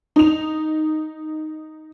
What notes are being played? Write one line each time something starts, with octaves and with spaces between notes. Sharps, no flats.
D#4 F7